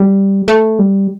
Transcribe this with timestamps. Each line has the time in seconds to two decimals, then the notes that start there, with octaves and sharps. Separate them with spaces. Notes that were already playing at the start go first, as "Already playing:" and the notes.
Already playing: G3
0.48 A3
0.79 G3